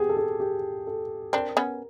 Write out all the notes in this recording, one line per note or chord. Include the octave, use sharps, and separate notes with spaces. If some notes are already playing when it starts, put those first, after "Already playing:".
Already playing: B3 G4 G#4
A4
G#4
G4
A4
C4 D4 A#4
B3 C#4